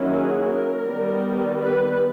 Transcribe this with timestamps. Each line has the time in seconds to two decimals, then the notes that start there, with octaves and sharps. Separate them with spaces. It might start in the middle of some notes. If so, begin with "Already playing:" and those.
Already playing: D#3 F#3 A#3 C#4 E4
0.12 G#4
0.49 A#4
0.86 D#3 G3 B3
1.60 B4